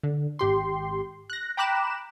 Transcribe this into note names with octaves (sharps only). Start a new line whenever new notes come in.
D3
G#1 G4 C6
F#6 A#6
G5 A#5 B5 D6 F#6 E7